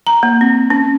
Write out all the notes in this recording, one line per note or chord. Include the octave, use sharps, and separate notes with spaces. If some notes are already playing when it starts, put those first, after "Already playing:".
A#5
A#3
C4
C#4